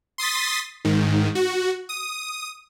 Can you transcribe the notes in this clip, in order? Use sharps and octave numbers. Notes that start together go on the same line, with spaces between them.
C6 D#6 A6 B6
G#2 D#3
F#4
D#6